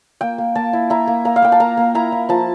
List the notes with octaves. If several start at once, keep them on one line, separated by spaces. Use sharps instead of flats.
A#3 G5
A#3
A#3 A5
E4
E4 A#5
A#3
A#3 A#5
F5
A#3 G5
A5
A#3 A#5
A#3
E4 A#5
E4
F3 A5